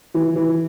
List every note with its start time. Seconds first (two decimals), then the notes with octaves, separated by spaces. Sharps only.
0.14 E3
0.36 E3